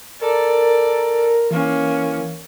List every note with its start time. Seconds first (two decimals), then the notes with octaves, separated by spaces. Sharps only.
0.21 A4 A#4 D5
1.51 E3 A#3 C#4